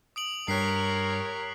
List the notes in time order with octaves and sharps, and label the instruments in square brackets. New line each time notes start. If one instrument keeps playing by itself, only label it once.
[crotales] D#6 D7 F#7
[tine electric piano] G2 [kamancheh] G4 C#5 [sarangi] A#4 [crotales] F#6 B6 C7